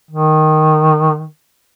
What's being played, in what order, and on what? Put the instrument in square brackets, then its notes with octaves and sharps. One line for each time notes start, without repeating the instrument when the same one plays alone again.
[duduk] D#3